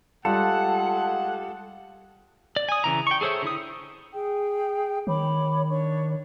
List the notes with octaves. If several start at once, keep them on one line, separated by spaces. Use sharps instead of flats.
G3 G#3 F4 A4 D#5 F#5 A5
D5
G#5 D#6
C#3 E3 A#5
G5 C#6
G#4 A4 C5 C#5 E5
D3 E4 D#6
G#4 G5
D#3 C#5 B5 D6
D4 C#5 C#6